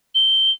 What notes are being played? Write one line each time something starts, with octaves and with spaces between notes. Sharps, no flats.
G7